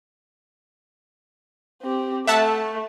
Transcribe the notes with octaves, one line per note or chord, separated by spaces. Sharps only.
C4 G4
A3 E5 F#5 A5